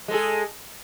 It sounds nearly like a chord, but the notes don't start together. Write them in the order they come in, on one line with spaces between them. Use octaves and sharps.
G#3 A4 G#4